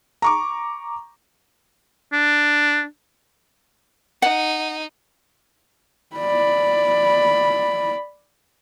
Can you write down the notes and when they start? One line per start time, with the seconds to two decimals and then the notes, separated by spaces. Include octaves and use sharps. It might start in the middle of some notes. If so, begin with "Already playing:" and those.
0.22 A#5 C#6 D6
2.13 D4
4.22 D#4 F#5
6.16 D5 B5